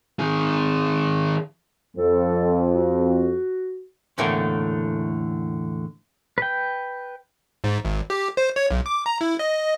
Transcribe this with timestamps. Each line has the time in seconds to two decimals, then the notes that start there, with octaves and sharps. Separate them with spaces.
0.19 D#3 G#4
1.97 F2 A4
2.73 F#4
4.18 E2 A2 D3 A3 A#3 A#4
6.38 B4 G5
7.64 G#2
7.85 G#1
8.10 G4
8.37 C5
8.56 C#5
8.71 B1
8.86 D6
9.06 A#5
9.21 E4
9.39 D#5